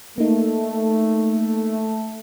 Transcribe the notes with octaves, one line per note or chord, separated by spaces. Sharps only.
A3 A#3 D#4